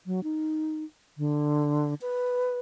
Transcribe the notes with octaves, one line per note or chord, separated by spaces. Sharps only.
F#3
D#4
D3
B4